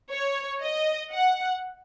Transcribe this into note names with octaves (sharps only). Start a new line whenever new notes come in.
C#5
D#5
F#5